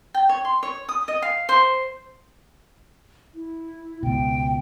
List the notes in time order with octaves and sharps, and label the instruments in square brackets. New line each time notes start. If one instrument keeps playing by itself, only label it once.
[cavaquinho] G5
C#5
C6
C#5
D#6
D#5
F5
C5
[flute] E4
[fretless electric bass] C#2 B2 [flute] G5